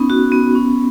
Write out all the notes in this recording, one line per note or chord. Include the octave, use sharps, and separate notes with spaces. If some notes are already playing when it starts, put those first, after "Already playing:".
Already playing: B3 C#4 D#4
F#4
B3
C#4